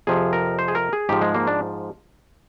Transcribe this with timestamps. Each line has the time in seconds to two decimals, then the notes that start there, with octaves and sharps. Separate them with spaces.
0.07 F2 C3 F3 G#4
0.33 A#4
0.59 C5
0.68 G#4
0.75 A#4
0.93 G#4
1.09 G#2 F3 G4
1.22 G#3
1.34 A#3
1.47 D4